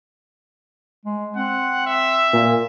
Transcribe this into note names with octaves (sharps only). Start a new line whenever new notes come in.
G#3
C4 F#5
E5
A#2